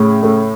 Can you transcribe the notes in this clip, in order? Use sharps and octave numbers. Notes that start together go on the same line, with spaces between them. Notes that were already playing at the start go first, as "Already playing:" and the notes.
Already playing: A2 C#3
A3